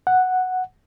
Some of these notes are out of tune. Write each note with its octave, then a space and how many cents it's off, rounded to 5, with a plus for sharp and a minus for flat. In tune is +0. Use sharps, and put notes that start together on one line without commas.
F#5 +0